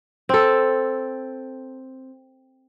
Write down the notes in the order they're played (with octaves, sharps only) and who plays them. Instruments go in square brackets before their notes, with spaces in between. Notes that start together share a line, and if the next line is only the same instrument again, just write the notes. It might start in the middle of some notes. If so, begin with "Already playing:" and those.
[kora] C4 A4